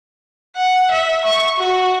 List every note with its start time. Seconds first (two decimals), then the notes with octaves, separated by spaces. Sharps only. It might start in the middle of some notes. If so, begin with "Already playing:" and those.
0.56 F#5
0.91 E5
1.25 C#6
1.58 F#4